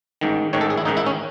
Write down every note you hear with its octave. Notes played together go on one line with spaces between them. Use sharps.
A1 G#2 D#3
A1 G#2 D#3 C#5
A4
G#4
E4
A1 G#2 D#3 D#4
E4
C#4